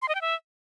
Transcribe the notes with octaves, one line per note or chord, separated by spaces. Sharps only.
C6
D#5
G5
E5